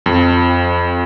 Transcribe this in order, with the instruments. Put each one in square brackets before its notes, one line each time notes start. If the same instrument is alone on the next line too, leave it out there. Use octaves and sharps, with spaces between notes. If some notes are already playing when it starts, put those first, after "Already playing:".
[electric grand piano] F2